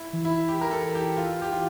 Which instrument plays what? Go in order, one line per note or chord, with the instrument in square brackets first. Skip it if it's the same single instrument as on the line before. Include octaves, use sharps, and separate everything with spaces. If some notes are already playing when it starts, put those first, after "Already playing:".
Already playing: [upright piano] E4
[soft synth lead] E3
[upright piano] E4
G4
A#4
A4
G4
F4
G4
F4